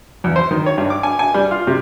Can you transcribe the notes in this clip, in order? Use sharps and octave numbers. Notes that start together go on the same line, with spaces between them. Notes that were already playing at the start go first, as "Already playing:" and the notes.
E2
C5
D#3
C#5
G2
D6
G#5
G#5
G3
F4
C3